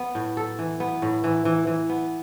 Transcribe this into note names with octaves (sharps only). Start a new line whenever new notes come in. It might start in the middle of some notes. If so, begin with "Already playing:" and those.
Already playing: B3
A2
A4
E3
B3
A2
E3
E3
E3
B3